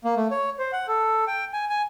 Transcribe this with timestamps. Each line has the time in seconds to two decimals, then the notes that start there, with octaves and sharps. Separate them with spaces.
0.04 A#3
0.17 A3
0.31 C#5
0.59 C5
0.73 F#5
0.88 A4
1.27 G5
1.53 G#5
1.69 G#5